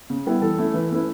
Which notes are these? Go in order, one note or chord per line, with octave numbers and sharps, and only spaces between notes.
C#3
G3 B3 E4
E3 A4
A3 C#4 E4
E3 B4
A3 C#4 E4 B4